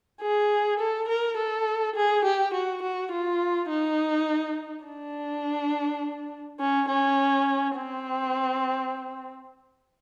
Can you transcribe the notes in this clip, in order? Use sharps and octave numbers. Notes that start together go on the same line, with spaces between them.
G#4
A4
A#4
A4
G#4
G4
F#4
F#4
F4
D#4
D4
C#4
C#4
C4